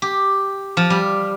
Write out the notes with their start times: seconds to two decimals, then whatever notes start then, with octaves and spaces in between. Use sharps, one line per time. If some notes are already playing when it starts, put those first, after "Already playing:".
0.02 G4
0.77 F3
0.90 G3